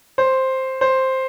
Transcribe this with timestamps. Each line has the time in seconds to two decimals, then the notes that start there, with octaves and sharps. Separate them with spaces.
0.18 C5
0.81 C5